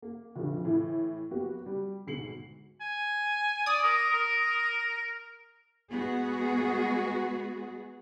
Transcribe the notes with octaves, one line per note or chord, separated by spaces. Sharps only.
A#3
F1 F2 A#2 D3
A2 E3 E4
F#3 A#3 B3 F#4 G4
G3
D2 G#2 B2 C7 C#7 F#7
G#5
D5 D#6
A#4
A#4
G#3 B3 F#4 G#4